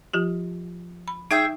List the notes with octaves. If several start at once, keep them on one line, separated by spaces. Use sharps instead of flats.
F3 F4 G4
B5
D#4 G#4 E5 G5